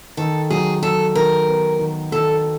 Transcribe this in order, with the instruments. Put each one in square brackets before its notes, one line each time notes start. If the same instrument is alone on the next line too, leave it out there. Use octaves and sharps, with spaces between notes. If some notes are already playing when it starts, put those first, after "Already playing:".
[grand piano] D#3 [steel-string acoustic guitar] A4
[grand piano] F#3 [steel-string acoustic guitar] G#4
[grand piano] F#3 [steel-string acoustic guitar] A4
[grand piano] D#3 [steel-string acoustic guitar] A#4
[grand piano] B3
D#3
[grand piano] D#3 [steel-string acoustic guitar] A4